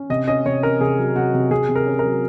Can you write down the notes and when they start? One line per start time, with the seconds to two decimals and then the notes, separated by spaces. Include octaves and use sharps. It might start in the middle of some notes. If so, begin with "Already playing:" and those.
Already playing: C#4
0.10 C3 D#5
0.27 C#4 D#5
0.45 C3 C#5
0.63 C#4 A#4
0.80 C3 G#4
0.98 F#3
1.16 C3 F#4
1.34 C3
1.51 C3 G#4
1.69 C3
1.76 A#4
1.86 C#4
1.99 A#4
2.04 F#3